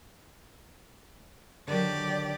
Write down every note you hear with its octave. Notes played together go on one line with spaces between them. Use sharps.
D3 D#3 F#3 G4 D5